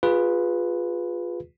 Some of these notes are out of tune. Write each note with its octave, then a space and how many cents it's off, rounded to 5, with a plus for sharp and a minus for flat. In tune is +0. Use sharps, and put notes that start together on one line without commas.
F4 +15 G#4 -20 B4 +0